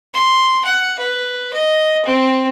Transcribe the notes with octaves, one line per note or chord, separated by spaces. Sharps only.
C6
F#5
B4
D#5
C4